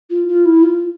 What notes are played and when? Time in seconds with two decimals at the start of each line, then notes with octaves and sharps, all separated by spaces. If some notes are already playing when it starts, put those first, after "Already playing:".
0.10 F4
0.28 F4
0.45 E4
0.62 F4